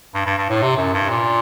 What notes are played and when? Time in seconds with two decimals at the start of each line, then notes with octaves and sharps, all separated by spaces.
0.14 G2
0.26 G2
0.37 G2
0.49 A2
0.62 C3
0.77 F#2
0.94 G2
1.09 A#2